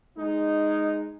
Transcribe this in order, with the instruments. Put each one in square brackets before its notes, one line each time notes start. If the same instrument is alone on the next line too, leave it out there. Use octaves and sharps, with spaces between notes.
[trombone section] G#3 D#4